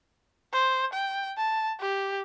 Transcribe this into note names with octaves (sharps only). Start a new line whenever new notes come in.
C5
G5
A5
G4